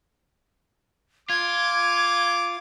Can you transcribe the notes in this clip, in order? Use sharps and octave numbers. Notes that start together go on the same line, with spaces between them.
F4 D6 G#6